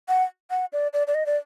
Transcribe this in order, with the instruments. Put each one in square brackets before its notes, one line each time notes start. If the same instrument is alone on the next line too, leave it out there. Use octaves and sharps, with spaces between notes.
[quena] F#5
F#5
D5
D5
D5
D#5
D5